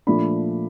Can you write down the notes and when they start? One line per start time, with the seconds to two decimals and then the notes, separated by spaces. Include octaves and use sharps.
0.07 A#2 F3 A3 D4 B5